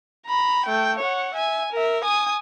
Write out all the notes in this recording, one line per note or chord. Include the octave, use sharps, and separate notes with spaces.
A#5 B5
A3 G5
C#5 F#5
E5 G#5
A#4 E5
G#5 D#6